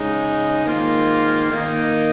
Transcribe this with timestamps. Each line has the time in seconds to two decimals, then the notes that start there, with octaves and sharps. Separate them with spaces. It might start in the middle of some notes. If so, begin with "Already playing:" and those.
Already playing: C#3 G#3 D#4
0.64 G#2 D#3 A#3 F4
1.51 D#3 A#3 D#4